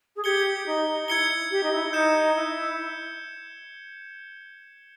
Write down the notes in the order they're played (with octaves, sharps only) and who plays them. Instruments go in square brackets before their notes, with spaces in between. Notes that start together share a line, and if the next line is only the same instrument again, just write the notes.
[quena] G#4
[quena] G4 [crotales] G#6 C#7 G7
[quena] D#4
[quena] E4 [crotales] G#6 C#7 G7
[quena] G4
D#4
E4
[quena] D#4 [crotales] G6 C#7 E7
[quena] E4